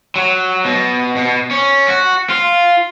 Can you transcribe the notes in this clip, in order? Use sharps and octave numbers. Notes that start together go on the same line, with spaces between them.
F#3
B2
B2
C#4
F#4
F4